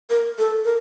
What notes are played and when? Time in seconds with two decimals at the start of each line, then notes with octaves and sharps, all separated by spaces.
0.10 A#4
0.38 A4
0.65 A#4